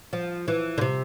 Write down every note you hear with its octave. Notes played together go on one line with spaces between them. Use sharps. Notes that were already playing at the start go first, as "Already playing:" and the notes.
F3
E3
D3
C3